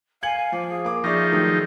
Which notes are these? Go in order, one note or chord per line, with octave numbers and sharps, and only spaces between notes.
F5 G#5 G#6 C#7 F#7
F3 D6
G#4
A#3 D6
F3 D#4 G#4 D5 E5 C#6
D#3 F#3 A3 E6